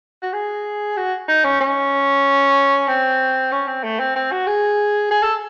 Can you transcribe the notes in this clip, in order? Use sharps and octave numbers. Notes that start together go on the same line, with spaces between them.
F#4
G#4
F#4
D#4
C#4
C#4
C4
C#4
C4
A3
C4
C4
F#4
G#4
G#4
A4